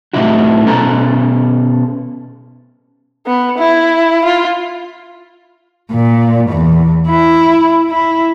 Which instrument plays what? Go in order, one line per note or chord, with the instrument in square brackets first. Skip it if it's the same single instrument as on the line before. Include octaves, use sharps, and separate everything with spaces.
[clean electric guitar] A2 C3 E3 D#4 E4 F#4
B2 C#4 A4 A#5
[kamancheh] B3
E4
F4
[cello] A#2
E2
E4
E4